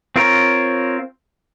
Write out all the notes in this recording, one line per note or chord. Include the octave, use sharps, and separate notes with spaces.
C4 F4 A#4 C#5